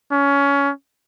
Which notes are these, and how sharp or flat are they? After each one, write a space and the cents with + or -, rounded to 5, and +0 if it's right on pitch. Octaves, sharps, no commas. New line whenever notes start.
C#4 +20